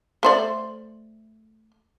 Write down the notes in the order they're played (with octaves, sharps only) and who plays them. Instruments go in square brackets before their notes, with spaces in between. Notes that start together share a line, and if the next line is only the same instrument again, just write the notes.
[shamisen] A3 C5 D5